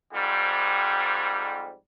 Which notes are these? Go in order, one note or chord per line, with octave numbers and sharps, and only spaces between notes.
F2 G#2 G3